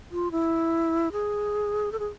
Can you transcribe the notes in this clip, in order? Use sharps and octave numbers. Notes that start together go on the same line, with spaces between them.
F4
E4
G#4
A4
G#4